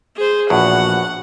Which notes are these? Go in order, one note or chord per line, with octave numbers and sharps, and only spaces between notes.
G#4 C5
A#1 E2 A2 F#4 F#5